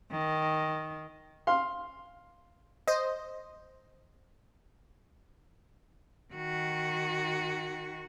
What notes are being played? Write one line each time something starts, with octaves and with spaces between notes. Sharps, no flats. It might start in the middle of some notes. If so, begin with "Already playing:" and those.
D#3
F5 C6
C5 D#5
D#3 F#4